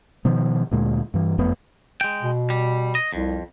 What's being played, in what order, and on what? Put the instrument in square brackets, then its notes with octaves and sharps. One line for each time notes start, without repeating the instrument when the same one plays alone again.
[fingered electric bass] B2 D#3 F3
D2 A#2 G#3
G2 E3
F#1 F2 A3 B3
[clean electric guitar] G#3 G5
[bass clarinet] B2
[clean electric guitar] G3
D#5
[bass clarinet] C2 [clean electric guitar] F2